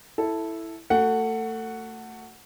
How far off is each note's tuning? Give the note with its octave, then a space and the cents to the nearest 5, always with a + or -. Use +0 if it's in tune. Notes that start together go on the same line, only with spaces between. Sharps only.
E4 +0 A4 +0
A3 +25 F#4 -5 F#5 +0